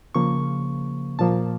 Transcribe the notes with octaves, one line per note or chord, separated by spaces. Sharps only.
C#3 F3 A#3 C#6
A#2 F3 A#3 A5